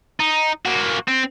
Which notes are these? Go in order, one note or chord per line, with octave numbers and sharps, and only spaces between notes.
D#4
A#3 F#4
C4